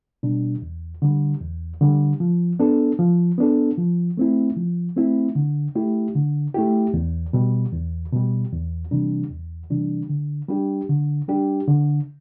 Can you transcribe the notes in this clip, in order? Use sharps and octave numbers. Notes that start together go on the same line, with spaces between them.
B2 G3 D4
E2
D3 G3
E2
D3 G3
F3
B3 D4 A4
F3
B3 D4 A4
F3
A3 C4 E4
F3
A3 C4 E4
D3
A3 E4 G4
D3
A3 E4 G4
E2
B2 G3
E2
B2 G3
E2
C3 E3 G3 D4
E2
C3 E3 G3 D4
D3
G3 D4 G4
D3
G3 D4 G4
D3